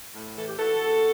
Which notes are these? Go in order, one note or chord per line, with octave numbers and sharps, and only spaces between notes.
A2
E3 A4
G4
E3 F#4 A4
E2